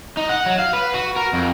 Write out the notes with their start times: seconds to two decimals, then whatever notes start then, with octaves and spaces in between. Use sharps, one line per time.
0.17 D#4
0.29 F#5
0.46 F#3
0.59 F5
0.73 B4
0.94 F#4
1.16 A#4
1.33 F2